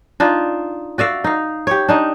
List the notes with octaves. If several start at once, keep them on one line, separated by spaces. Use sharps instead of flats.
D4 D#4 F4
F#4 D5 E5 F5
D#4 F5
G4 C#5
D4 D#4